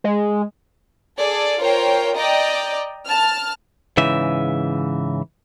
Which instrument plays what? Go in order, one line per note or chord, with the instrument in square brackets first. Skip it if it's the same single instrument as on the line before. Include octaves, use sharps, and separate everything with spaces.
[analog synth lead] G#3
[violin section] G#4 A4 D5
F4 A#4 C5 C#5 G5
D5 D#5 G5 A#5 D6
A5 F6
[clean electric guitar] G#2 C#3 E3 E5